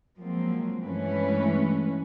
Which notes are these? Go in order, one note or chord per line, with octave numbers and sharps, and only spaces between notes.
F3 F#3 G#3 A#3 C4
G2 E3 G#3 A3 C#4 B4